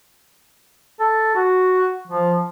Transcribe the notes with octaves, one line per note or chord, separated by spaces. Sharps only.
A4
F#4
F3